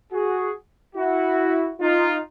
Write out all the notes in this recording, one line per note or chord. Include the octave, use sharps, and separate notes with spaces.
F#4 G#4
E4 F#4
D#4 F4